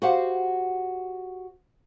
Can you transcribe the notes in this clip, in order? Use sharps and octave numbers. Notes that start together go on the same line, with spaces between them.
F#4 G4 C5 F5 F#5